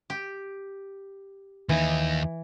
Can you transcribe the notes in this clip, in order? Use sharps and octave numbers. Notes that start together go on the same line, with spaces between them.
G4
D#2 E3 D#4